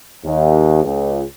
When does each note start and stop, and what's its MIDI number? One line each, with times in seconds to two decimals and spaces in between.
0.25 0.80 39
0.83 1.23 37